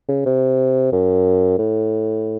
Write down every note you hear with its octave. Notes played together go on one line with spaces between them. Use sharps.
C#3
C3
F#2
A2